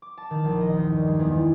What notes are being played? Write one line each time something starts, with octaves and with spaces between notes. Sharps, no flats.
D6
A5
D#3
A#1
D#5
D#2
G2
G#3
E2
G2